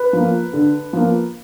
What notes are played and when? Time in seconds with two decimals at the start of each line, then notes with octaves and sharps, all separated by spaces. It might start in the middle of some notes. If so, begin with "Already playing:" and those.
Already playing: B4
0.13 F3 A#3
0.53 D3
0.93 F3 A#3